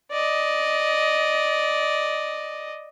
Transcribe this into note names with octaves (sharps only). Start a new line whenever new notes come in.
D5 D#5